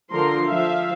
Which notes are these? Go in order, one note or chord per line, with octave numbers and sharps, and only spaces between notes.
D3 F3 A#4 A#5 C6
F3 E5 F5